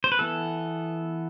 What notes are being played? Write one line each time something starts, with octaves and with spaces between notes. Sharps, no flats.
C5
B4
E3 B3 A4